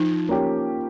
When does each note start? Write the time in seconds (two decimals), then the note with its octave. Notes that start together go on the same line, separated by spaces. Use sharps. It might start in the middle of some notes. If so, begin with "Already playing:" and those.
Already playing: F3 D#4
0.29 A#3 C#4 G4